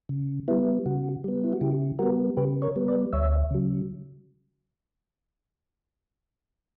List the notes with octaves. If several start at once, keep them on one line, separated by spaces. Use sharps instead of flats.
C#3
G3 B3 E4
C#3 F#4
G3 B3
E4
F#4
C#3 E4 G4
G3 B3 F#4 A#4
C#3 G4 B4
A#4 C#5
G3 B3
B4 D5
D2 C#5 E5
C#3 F#3